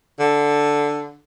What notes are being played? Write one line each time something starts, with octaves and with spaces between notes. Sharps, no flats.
D3